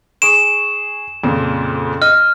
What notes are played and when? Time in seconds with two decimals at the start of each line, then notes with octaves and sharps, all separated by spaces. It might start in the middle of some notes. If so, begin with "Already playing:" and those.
0.22 G#4 C#6 D7 E7
1.23 F2 A#2 C#3
2.02 D#5 F6